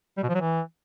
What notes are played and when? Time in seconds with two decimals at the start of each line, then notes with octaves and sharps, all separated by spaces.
0.17 G3
0.23 B2
0.29 F3
0.35 F#3
0.41 E3